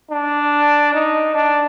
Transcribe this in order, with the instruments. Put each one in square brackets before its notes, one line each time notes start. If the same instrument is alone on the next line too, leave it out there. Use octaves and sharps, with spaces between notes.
[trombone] D4
D#4
D4